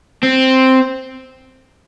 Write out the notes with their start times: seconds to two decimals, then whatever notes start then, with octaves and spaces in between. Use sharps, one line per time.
0.23 C4